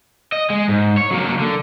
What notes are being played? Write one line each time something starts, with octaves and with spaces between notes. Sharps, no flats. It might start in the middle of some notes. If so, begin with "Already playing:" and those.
D#5
G#3
G#2
C#5
F#3 A#3
D3